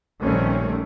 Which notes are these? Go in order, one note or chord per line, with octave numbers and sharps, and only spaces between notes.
A#1 D#3 G3 A3 C4 C#4